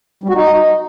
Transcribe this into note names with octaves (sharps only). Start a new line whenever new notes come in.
G3
F#4
D#4